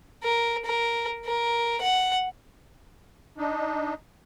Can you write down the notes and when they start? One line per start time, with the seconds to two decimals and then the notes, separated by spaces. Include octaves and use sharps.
0.23 A#4
0.65 A#4
1.25 A#4
1.81 F#5
3.38 D4 D#4